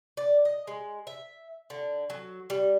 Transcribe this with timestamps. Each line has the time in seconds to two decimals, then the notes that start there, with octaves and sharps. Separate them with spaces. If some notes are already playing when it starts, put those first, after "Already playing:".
0.17 D5
0.45 D#5
0.67 G#3
1.07 E5
1.70 D3
2.10 F#3
2.50 G3